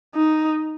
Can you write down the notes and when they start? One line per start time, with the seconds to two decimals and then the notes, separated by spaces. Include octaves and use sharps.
0.15 D#4